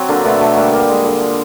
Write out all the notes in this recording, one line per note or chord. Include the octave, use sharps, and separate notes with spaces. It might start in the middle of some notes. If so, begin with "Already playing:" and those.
Already playing: F#3 C4
D3 A#3
B2 A3 B3
B2 A3
G3 A#3
G3 A#3
G#3
D3
F3